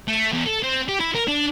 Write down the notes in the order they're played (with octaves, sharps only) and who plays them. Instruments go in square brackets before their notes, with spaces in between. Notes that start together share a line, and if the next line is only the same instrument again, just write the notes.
[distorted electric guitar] A3
E2
A4
C4
G4
E4
A#4
D4